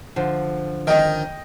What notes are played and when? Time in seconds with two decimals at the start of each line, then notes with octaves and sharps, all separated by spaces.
0.16 D3 F3
0.87 D#3 D#5 G5